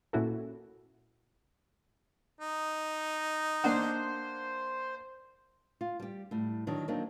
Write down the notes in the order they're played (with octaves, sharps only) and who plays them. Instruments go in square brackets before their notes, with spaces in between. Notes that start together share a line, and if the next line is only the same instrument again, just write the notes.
[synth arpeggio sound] A#2 C#4 E4 F#4 A4
[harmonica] D#4
[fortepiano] A#3 D4 F#5 [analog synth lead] C5
[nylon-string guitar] F4
G3 G4
A2 G3
D#3 F#3 D4
F#3 A#3 C4 D4 D#4